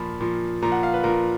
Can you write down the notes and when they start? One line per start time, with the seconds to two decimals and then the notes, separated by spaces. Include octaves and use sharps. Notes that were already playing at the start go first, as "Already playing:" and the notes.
Already playing: A#2 F3 B5
0.21 A#2 F3
0.62 A#2 F3 A#5
0.72 F#5
0.83 F5
0.94 B4
1.04 A#2 F3 A#4